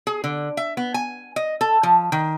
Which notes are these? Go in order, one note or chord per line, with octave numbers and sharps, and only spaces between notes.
G#4
D3
E5
B3
G#5
D#5
A4
F3
D#3